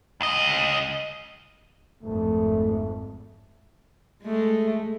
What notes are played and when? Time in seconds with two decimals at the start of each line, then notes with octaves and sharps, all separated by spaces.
0.21 C#2 D#5
2.03 G#1 F2 G#2 A3
4.23 G#3 A3